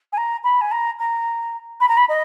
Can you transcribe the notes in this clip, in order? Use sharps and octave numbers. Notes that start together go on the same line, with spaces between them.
G#5
A#5
B5
G#5
A#5
A#5
B5
A#5
B5
D#5